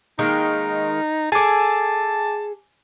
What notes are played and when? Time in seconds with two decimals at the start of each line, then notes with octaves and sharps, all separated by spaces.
0.19 D#3 G#3 A#3 D#4
1.32 G#4 A4 G#5 A5 D6